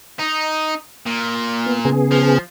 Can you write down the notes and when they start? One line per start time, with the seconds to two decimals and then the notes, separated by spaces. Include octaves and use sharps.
0.19 D#4
1.06 A#2
1.66 B3
1.85 C#3 B3 G#4
2.11 F3